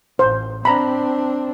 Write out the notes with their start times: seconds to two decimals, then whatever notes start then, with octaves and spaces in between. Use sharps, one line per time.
0.19 A1 C5
0.65 C4 D4 A#5 B5